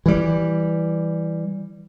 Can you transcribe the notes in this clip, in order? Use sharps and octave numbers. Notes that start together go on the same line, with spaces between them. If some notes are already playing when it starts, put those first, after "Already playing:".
E3 G3